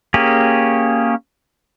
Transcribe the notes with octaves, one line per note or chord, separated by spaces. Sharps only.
A#3 C#4 G4 G#4